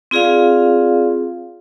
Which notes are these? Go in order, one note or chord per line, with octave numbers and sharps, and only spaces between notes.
C4 F4 G#4 D5 F5